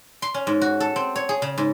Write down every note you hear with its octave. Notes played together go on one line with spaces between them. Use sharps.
C6
C#4
G#2
F#4
A4
C4
C#5
G#4
C#3
G#2